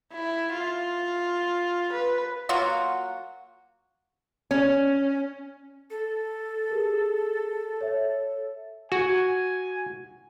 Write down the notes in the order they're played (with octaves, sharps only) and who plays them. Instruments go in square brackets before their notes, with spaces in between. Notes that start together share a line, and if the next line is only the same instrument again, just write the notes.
[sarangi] E4
F4
B4
[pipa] F#3 A#3 F4 F#4
[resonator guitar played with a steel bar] C#4
[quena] A4
[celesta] G4 G#4 A#4
C#5 E5
[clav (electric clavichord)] F#4 [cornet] G#5